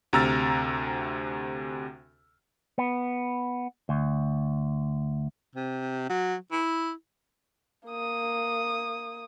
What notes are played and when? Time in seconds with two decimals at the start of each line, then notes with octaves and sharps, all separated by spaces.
0.13 D2 C3 A#5 E6 F6 A6
2.78 B3
3.89 D2
5.55 C3
6.09 F#3
6.52 E4
7.87 A#3 D#6